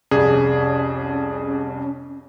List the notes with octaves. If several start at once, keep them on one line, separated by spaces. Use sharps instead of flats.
C2 F2 C#4 G#4